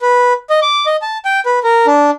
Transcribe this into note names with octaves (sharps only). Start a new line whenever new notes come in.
B4
D#5
D6
D#5
A5
G5
B4
A#4
D4